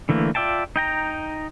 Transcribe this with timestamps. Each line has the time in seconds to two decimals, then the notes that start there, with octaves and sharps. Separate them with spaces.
0.09 D3 E3 A3 A#3
0.35 F4 D5 E5 G5 A5
0.76 D#4 G5 A#5